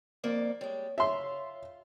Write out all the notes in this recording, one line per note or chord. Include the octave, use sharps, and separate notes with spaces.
F2 A#3 D5
G3 G#3 C#5
F4 C#5 E5 C6